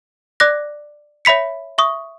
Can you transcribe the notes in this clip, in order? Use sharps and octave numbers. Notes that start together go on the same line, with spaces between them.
D5 D6 F#6 A#6
C#5 E5 B5 B6 C#7
E5 C#6 D#6